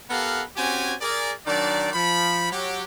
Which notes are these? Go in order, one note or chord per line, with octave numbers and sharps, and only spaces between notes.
B3 G4 A4 A#4 F5 F#5
C4 C#4 F#4 G4 G#5
G#4 A#4 D5
D#3 F#3 D4 D5
F3 B5
F#3 G4